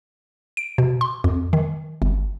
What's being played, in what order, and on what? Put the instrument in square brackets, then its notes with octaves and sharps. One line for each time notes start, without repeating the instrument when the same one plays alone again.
[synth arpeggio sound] D7
B2
C6
F2
D#3
G1